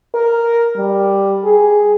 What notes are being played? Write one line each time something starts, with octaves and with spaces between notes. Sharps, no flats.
A#4
G3
G#4